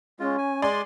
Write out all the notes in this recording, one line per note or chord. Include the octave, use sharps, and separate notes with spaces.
G#3 C#4 F4
G#5
G#3 D5 G#5 C6